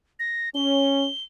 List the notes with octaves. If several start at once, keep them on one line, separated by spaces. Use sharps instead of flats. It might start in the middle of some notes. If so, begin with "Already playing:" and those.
A#6
C#4 G7